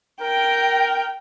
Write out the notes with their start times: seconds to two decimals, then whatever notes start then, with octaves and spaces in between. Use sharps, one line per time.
0.21 A#4 G5